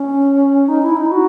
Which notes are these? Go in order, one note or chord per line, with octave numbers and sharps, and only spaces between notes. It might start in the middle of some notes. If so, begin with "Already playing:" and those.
Already playing: C#4
D#4
E4
D#4
E4
F#4